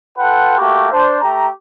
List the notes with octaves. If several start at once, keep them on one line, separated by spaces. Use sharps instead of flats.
F4 A4 B4 F#5 G5
A3 A#3 F#4 G4
D4 C5
A3 G4 A#5